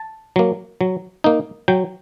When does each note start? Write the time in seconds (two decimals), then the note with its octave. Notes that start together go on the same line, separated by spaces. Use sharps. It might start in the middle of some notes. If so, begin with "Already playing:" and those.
Already playing: A5
0.36 F#3 A#3
0.81 F#3
1.24 A#3 D#4
1.68 F#3 G5